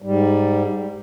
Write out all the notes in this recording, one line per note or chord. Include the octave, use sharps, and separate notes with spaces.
G#2 G3